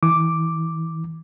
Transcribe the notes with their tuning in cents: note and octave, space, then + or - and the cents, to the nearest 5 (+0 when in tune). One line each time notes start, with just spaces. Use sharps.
E3 -30 D6 +0